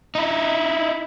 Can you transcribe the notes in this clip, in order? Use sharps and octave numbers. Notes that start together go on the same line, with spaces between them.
D#4 E4